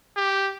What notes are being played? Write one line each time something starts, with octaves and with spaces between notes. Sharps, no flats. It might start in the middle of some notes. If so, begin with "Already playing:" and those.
G4